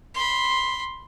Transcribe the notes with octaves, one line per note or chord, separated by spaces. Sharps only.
B5 C6